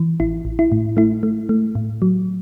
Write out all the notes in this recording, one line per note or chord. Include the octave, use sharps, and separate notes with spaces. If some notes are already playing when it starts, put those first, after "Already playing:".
Already playing: E3
A1 E4
A1
E4
A2
A3 E4
A3
A3
A2
F#3